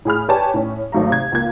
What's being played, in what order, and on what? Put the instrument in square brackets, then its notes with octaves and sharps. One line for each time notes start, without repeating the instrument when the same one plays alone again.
[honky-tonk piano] A2 G#4 B5 F6
G4 B4 C#5 D5 G#5 A5
A2 C#4
G#1 F#3 A3 F5 A#5
C3 G#6
C#2 A#3 G#6